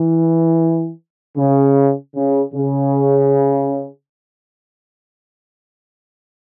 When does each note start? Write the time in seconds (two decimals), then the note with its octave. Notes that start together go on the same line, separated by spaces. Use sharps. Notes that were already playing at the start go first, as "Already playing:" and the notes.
Already playing: E3
1.37 C#3
2.15 C#3
2.53 C#3